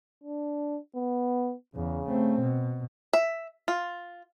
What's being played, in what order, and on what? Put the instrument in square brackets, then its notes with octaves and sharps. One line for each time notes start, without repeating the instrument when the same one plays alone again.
[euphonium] D4
B3
[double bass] E2 [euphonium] C#3
[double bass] A3 C4
B2
[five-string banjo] E5
F4